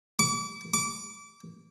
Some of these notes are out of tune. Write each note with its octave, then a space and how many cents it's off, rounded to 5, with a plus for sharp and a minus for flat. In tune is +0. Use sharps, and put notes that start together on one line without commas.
D6 -35
D6 -25